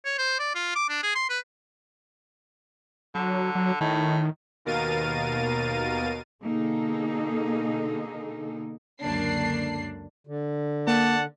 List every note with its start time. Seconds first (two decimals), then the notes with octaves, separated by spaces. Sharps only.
0.05 C#5
0.18 C5
0.39 D5
0.55 F4
0.75 D6
0.89 D4
1.03 G#4
1.15 C6
1.29 B4
3.15 D3 F#3
3.55 F#3
3.81 A2 D#3
4.65 D#2 B2 A#4 F5 A6 D#7
6.43 B2 D3 A#3 D#4 G#4 A4
9.02 C#2 F#2 D3 A#3 D4 C7
10.27 D3
10.87 A#3 D5 F#5 A5